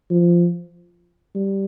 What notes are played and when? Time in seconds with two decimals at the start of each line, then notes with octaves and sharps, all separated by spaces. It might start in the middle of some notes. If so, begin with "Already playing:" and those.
0.11 F3
1.35 G3